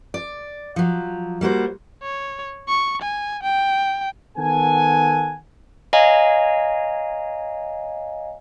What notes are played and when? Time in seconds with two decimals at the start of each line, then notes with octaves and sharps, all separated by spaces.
0.14 D5
0.76 F3 F#3
1.41 G3 A#3 F#4 C5
2.02 C#5
2.68 C#6
3.02 G#5
3.43 G5
4.38 D#3 B3 A4 F#5 G#5
5.93 C#5 D#5 F5 G#5 A#5